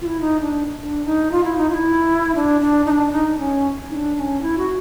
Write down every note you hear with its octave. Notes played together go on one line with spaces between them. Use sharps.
F4
E4
D#4
D4
D4
D#4
F4
E4
D#4
F4
E4
D4
D4
D#4
D4
D#4
C#4
D#4
D4
D4
C#4
E4
F#4